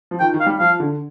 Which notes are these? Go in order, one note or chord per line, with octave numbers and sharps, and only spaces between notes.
F3
D#3 G5
D#3
F5
G3
F3 F5
D3